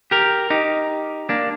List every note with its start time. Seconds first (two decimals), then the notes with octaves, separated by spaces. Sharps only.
0.11 G4 A#4
0.50 D#4 G4
1.29 A#3 D4